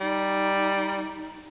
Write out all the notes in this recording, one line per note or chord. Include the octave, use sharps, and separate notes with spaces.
G3 D#4